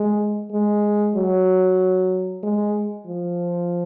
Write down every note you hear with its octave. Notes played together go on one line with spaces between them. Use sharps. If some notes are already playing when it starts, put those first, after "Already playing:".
Already playing: G#3
G#3
F#3
G#3
F3